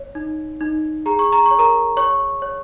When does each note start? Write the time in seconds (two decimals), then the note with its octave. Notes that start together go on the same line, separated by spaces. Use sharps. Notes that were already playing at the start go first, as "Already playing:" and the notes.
Already playing: C#5
0.15 D#4
0.61 D#4
1.06 G#4 A#5
1.19 C#6
1.32 A#5
1.46 C#6
1.51 C#5
1.59 A#4 A#5
1.97 C#5 C#6
2.42 C#5